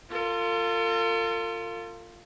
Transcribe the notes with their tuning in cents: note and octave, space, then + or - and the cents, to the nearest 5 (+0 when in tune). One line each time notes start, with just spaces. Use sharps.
F4 +0 A4 +45